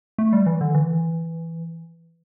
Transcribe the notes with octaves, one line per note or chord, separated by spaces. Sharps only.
A3
G3
E3
D3
E3